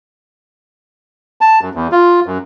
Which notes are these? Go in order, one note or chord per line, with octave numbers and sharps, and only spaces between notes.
A5
F#2
E2
F4
F#2